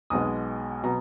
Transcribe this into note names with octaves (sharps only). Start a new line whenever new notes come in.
B1 B2 G#3 D#6
B2 F#3 A#5